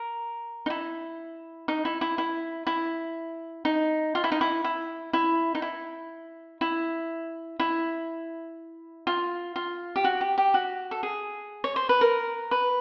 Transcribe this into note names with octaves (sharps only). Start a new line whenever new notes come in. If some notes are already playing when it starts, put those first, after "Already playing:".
Already playing: A#4
D#4
E4
D#4
E4
E4
E4
E4
D#4
F4
E4
D#4
E4
E4
E4
D#4
E4
E4
E4
F4
F4
G4
F#4
G4
G4
F#4
A4
G#4
C#5
C5
B4
A#4
B4